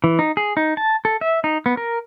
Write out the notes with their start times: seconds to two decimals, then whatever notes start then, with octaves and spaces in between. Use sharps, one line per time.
0.04 E3
0.19 D#4
0.37 G#4
0.57 D#4
0.77 A5
1.05 A4
1.21 E5
1.44 D#4
1.66 B3
1.77 A#4